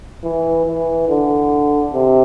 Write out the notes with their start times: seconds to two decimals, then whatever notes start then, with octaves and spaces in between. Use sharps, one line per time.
0.23 E3
0.66 E3
1.08 D3
1.93 C3